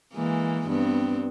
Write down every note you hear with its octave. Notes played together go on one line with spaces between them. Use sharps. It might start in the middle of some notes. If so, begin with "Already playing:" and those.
E3 G#3 A#3
G2 B3 C4